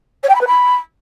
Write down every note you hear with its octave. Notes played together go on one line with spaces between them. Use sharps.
C#5
G5
B5
B4
B5